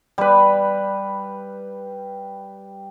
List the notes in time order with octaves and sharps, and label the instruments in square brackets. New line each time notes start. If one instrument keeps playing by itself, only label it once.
[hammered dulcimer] G3 B4